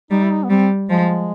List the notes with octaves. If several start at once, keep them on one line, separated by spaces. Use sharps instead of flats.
G3 D#4
E4
D#4
B3
G3 C4
F3 G#3